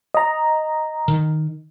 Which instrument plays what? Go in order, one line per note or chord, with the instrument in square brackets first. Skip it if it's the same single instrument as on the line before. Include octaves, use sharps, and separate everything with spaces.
[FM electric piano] D#5 A#5
[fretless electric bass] D#3